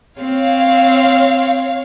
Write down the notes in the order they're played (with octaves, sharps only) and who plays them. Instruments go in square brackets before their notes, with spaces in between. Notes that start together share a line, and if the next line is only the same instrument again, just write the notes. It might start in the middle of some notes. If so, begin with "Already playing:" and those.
[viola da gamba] C4 [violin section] C#5 F5